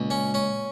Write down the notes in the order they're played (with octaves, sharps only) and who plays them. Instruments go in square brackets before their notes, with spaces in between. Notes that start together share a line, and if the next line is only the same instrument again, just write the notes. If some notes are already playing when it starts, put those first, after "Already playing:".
Already playing: [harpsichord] C#2 [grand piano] A#2
[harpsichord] C#4
C#4